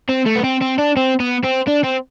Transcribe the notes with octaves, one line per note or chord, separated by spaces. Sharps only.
C4
A3
B3
C4
C4
D4
C4
B3
C4
D4
C4